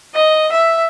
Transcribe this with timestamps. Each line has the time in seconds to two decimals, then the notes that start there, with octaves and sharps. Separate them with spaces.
0.15 D#5
0.52 E5